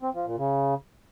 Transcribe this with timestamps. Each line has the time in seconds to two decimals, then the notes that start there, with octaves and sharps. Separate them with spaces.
0.02 C4
0.14 F3
0.26 A#2
0.38 C#3